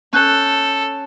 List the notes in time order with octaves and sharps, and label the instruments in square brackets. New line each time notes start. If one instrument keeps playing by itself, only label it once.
[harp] C#4 F#6 G6 [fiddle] A4